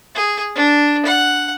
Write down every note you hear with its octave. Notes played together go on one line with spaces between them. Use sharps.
G#4
D4
F#5